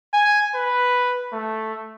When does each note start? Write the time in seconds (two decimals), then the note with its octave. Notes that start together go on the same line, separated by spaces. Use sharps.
0.14 G#5
0.55 B4
1.33 A3